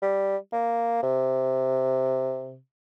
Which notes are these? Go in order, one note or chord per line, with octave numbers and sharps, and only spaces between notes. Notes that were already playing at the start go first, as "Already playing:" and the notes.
G3
A#3
C3